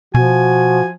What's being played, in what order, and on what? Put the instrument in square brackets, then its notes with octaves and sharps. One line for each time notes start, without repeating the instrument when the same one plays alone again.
[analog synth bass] B2 [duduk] F3 [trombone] F#4 [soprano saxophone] G#5